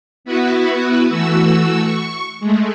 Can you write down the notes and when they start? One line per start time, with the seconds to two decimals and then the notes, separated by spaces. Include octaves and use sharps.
0.25 B3 E4 F#4 B4
1.09 E3 A3 F#4 E6
1.82 C#6
2.40 G#3 A3